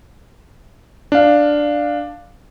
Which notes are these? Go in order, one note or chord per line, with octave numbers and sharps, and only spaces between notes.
D4 F5